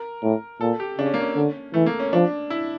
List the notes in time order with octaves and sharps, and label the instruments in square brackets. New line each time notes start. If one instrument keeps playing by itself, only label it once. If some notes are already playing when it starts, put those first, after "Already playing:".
Already playing: [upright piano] A#4
[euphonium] A2
[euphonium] A#2 [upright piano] A4
[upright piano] G4
[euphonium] C#3 [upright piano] D4
[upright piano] C#4
A#3
C#4
[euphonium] D3
[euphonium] E3 [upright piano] A3
[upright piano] A#3
C#4
[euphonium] F3 [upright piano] D4
[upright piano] E4